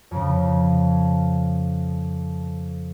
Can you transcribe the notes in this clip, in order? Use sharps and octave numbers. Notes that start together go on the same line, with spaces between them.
F2 C#3